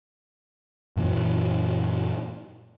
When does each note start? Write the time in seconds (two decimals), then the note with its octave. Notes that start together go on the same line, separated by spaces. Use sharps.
0.97 F#2 A#2 E3 F#3